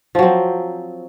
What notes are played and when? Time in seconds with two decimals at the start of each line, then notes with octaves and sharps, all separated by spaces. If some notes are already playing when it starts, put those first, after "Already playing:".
0.15 F3
0.19 F#3
0.23 C4